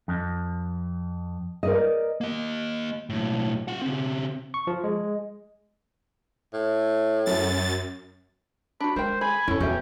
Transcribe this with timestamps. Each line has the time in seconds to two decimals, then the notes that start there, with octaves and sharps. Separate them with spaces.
0.08 F2
1.63 A#4 D5 D#5
2.21 A#3 D#5
3.10 B1 A2
3.68 F4 F#5
3.82 C#3 C4
4.54 C#6
4.67 F3
4.84 G#3
6.54 A2
7.26 F#2 A6
8.80 D4 F#4 B5
8.96 G#3 A#4 C5 G5
9.21 G#4 G#5 B5
9.48 F2 C#4 E4 A4
9.61 E2 F#4 G4 E5 G5